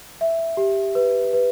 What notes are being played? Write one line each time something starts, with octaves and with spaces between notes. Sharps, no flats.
E5
G4
B4
B4